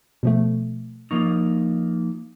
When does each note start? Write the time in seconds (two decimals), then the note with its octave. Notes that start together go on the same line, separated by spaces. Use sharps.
0.23 B2 F3 A3
1.11 F3 A#3 D#4 C#6